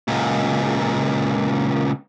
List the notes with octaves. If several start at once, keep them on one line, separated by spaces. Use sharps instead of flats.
C#2 A#2